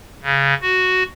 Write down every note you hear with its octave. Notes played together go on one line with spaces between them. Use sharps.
C#3
F#4